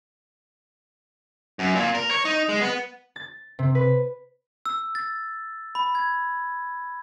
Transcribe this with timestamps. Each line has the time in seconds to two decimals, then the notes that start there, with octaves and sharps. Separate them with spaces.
1.59 F#2
1.75 A#2
1.95 A#4
2.11 C#5
2.25 D#4
2.49 G#3
2.61 B3
3.16 A6
3.59 C3
3.75 B4
4.66 E6
4.95 A6
5.75 B5
5.95 G#6